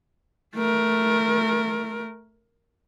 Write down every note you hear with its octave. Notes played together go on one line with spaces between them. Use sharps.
A3 A#4